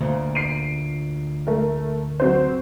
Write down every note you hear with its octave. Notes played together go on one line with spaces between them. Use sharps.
D2 A#2
C7 D7 D#7
A3 A#4
F#3 C4 C5